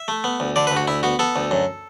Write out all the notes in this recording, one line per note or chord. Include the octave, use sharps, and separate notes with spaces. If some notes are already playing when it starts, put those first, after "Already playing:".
Already playing: E5
A3
B3
D2
D3 D5
B4
D2
F#4
D2 E4
B3 F#4
B3 A4
D2
F#2